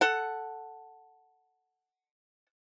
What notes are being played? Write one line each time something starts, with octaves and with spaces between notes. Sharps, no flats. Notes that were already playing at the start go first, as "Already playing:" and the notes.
A4 F#5